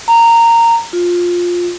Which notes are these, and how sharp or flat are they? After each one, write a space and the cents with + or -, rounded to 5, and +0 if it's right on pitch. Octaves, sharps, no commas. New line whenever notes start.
A#5 -15
F4 +10